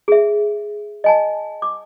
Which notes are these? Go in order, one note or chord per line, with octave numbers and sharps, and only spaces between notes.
G#4 E5
D#5 G#5 A5
D6